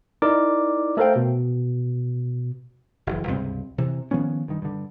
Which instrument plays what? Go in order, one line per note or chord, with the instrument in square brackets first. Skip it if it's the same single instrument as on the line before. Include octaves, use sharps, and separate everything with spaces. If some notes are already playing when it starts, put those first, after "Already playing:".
[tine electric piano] D#4 E4 A#4 D5 D6
A3 A4 A#4 C5 F5 G5
B2
[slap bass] F#1 C3 E3
C#2 G2 C3 C4
C3 E3
D#3 F3 B3 C#4
G2 D#3
G2 D3